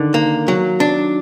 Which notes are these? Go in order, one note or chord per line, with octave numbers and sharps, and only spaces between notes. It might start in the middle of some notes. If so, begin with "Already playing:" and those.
Already playing: D3 D#3
A#3
F#3
D4